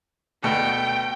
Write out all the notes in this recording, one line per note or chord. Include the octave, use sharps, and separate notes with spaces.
D2 B2 A3 G5